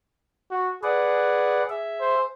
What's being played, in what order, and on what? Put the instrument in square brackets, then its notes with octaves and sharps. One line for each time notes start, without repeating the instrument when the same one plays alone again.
[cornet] F#4
[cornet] G#4 [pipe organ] B4 D5 F#5
[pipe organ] G#4 E5
[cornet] C5